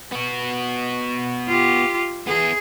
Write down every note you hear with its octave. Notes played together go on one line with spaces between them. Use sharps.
B3 F#4
F4 G4
B3 E4 G#4